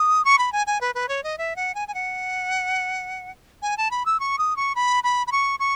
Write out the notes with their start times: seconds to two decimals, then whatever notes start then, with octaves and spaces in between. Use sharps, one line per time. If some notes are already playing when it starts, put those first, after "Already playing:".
Already playing: D#6
0.25 C#6
0.38 B5
0.52 G#5
0.67 G#5
0.81 B4
0.95 B4
1.09 C#5
1.23 D#5
1.38 E5
1.56 F#5
1.75 G#5
1.88 G#5
1.94 F#5
3.62 G#5
3.77 A5
3.91 B5
4.06 E6
4.20 C#6
4.38 D#6
4.56 C#6
4.75 B5
5.04 B5
5.27 B5
5.32 C#6
5.60 C#6